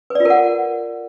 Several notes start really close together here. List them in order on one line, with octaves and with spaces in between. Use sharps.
B4 D5 F4 A#4 F#5